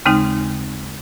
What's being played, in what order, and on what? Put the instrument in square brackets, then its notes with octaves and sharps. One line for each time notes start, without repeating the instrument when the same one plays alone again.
[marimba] D#2 C#3 G#3 C4 D#4